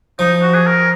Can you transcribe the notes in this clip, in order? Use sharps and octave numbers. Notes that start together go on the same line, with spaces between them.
F3 D#4
F#4
G#4
A#4